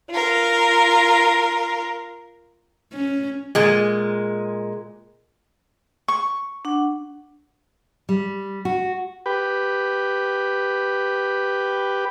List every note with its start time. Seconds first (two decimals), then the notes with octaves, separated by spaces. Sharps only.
0.10 F4 A#4
2.93 C#4
3.55 A#2 G#3
6.08 C#6
6.65 D4 F#5
8.09 G3
8.65 F#4
9.26 G4 B4